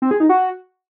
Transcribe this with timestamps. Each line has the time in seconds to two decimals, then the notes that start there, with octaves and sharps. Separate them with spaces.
0.02 C4
0.11 G#4
0.20 D#4
0.29 F#4